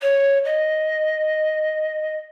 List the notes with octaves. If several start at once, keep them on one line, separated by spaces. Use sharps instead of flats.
C#5
D#5